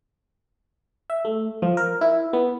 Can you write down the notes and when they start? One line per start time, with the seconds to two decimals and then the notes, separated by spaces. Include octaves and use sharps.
1.10 E5
1.25 A3
1.62 F3
1.77 A#4
2.01 E4
2.33 B3